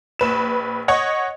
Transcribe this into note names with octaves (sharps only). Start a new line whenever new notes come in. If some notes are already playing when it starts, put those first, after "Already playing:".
A#1 B4 E7
C#5 D#5 F#5